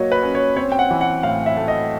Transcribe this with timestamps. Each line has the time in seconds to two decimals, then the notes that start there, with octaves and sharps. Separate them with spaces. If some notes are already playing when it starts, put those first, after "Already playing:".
Already playing: F#3 A#3 C#5 D#5
0.12 B4
0.23 C#4
0.35 C#5
0.56 C4 C#5
0.72 G5
0.79 F#5
0.91 E3
1.01 F#5
1.23 A2 F5
1.46 E5
1.57 A3
1.68 D#5